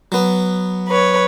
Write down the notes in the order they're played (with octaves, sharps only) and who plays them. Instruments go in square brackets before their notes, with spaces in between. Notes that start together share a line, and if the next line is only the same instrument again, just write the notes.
[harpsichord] F#3 B3
[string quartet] B4 C#5